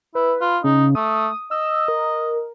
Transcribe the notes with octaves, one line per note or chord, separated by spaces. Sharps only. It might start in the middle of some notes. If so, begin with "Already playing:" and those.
E4 B4
F4
C#3 D#4
A3 D#6
D#5 E6
A#4